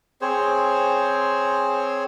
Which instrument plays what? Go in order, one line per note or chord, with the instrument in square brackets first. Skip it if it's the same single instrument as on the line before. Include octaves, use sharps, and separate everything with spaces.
[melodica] C4 G#4 C5 C#5